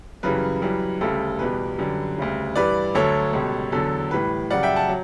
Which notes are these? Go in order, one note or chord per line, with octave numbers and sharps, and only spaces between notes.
F#2 C#3 E3 G3 B4
F#2 E3 G3
D2 C#3 G3 A4
E2 B2 G3 B4
F#2 D3 G3
D2 C#3 G3
G2 E3 G3 B4 D5
D2 D3 F#3 A4 C#5
C#2 B2 G3
E2 D3 F#3 A4
A2 E3 G3 B4
F#2 C#3 G3 D5 F#5
E5 G5
F#5 A5
F#3